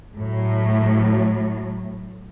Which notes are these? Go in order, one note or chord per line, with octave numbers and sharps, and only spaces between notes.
A2 F#3